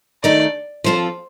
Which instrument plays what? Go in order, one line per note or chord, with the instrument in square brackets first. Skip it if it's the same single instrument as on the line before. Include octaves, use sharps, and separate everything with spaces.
[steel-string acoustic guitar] D#3 A3 D#4 A4 [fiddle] D5
[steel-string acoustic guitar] F3 C4 F4 A4 [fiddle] C5